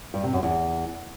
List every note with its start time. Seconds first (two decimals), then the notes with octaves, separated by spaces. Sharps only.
0.14 G2
0.24 C3
0.33 F#2
0.43 E2